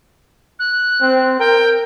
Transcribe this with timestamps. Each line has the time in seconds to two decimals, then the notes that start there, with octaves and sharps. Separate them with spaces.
0.59 F#6
1.01 C4
1.39 A#4 G5